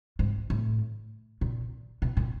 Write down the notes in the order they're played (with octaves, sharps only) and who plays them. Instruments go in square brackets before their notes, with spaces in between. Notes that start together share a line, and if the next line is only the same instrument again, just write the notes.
[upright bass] G#2
A2
A#2
B2
A#2